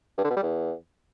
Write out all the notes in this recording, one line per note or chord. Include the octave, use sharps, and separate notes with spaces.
G2
D3
B2
G3
E2